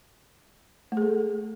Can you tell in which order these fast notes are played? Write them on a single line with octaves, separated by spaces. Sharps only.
A3 G#4 A4